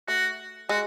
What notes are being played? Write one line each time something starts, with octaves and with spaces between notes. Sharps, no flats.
A3 F#4
G#3 F#4